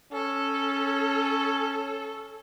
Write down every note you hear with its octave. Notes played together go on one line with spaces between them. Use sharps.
C#4 A4